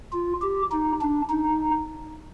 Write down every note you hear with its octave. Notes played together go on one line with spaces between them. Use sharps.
F4
G4
D#4
D4
D#4